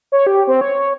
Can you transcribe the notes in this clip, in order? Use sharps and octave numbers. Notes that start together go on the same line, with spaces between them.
C#5
G4
C4
C#5